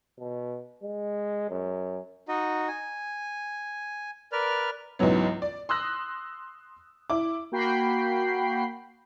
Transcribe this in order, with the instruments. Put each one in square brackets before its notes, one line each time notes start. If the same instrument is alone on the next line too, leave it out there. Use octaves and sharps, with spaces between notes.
[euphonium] B2
G#3
F#2
[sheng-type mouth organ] D#4 F#4 D#5
G#5
A#4 B4 D5 F6
[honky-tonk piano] C#2 G#2 E3 F#3 B3
D5
C6 D#6 E6 F#6 A#6
E4 D6
[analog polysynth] A#3 F#4 G5 B5 C7